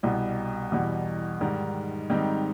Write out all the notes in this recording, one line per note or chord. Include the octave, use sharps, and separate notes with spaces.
C2 B2 G3
E2 B2 G3
G#2 D#3 G3
G#2 D#3 G3 C4 D#4